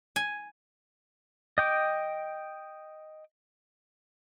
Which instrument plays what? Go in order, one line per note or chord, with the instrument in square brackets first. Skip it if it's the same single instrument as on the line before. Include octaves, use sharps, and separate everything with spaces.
[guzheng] G#5
[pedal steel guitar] D#5 G5 D6